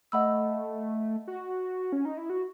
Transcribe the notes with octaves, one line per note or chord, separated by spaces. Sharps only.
A3 D#5 F#5 B5 E6
F#4
C#4
D#4
E4
F#4